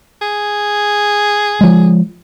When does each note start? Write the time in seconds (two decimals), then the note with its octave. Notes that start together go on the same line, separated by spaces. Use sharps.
0.22 G#4
1.61 F3 G#3